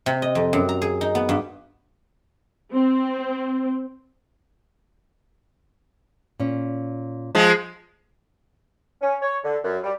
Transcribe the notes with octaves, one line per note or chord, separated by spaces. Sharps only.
C3
D#5
F2
F#2
A#5
G#4
D#4
B3
G2
C4
A#2 C#4
F3 G#3
C#4
C#5
D3
F#2
G3